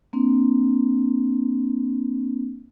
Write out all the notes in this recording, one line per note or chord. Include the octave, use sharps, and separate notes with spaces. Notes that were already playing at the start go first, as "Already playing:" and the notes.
A#3 C4 D4